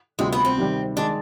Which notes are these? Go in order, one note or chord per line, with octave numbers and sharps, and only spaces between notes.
D2 C3 G3 G#3 C4 F4
B3
C4
C3 D#3 G3
D#3 G#3 D4